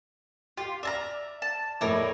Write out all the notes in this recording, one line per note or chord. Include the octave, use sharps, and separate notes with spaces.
F4 G4
D5 E5 A5 A#5 F6
A5
F2 A2 G#3 E4 A#4 C#5 D5